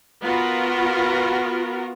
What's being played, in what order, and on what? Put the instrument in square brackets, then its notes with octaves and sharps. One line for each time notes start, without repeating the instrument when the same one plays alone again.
[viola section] B3 F4 F#4 A#4